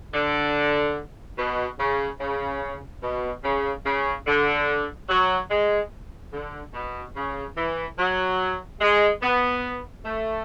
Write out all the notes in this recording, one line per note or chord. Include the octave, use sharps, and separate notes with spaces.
D3
B2
C#3
C#3
B2
C#3
C#3
D3
F#3
G#3
D3
B2
C#3
E3
F#3
G#3
B3
A3